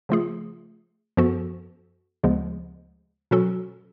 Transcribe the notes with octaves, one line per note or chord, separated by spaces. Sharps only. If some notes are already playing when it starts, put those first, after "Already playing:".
C#3 F3 A3 F4 G#4
F#2 F3 B3 F#4 A4
D2 C#3 F3 G#3 B3
B2 F#3 C#4 F#4 A4